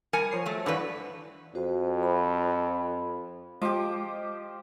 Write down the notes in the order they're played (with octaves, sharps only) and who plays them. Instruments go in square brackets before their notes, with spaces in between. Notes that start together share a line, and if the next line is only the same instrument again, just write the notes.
[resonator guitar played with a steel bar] G3 A#4 G#5 [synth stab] G#6 A6 C#7
[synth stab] F3 C#5 C7
[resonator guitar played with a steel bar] F#3 A3
[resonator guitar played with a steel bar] G2 E3 B4 [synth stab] D3 F#4
[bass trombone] F2 [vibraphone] F#4 C5
[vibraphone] B5
[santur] F3 G4 [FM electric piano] G#3 D#5 D6